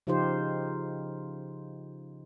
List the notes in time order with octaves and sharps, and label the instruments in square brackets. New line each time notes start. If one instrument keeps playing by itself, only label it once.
[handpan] C#3 F3 D#4 F4 G4 C5